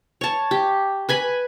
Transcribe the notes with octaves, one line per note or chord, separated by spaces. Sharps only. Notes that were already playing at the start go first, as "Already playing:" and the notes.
C#5 A5
G4
B4 G#5 B5